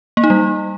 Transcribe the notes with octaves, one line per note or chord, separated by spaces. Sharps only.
A#3
D#4
G3